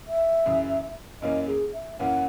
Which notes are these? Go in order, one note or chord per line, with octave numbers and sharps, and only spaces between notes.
E5
F#2 C#3 E3
F#2 E3 A#3 C#4 D#5
G#4
E5
F#2 E3 A#3 C#4 F#5